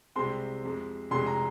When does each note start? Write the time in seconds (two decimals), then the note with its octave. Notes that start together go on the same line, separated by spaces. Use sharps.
0.16 C2 C3 G#3 C4 C6
0.63 F2 C3 G#3
1.11 F1 F2 C3 G#3 C6
1.26 A#5